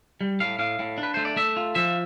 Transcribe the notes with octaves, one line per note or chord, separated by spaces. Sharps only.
G3
A2 F5
A2 F5
A2
D4
B4
A3 C5
D5
A3 E5
F4
F3 E5